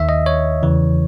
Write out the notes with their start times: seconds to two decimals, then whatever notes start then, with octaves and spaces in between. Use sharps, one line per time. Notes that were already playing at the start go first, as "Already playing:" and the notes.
Already playing: D#2 D#3 E5
0.09 D#5
0.26 C#5
0.63 E2 C#3 E3